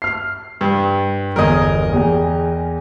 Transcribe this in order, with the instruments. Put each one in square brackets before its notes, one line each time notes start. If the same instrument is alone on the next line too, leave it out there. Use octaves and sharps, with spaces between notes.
[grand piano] F6 C7
[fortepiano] G2
[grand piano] G1 E2 G#6 [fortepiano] A#4 D#5
[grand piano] E2 G#4 G5